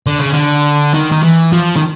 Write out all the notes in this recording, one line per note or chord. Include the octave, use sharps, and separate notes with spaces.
D3
C#3
D3
D#3
D#3
E3
F3
D#3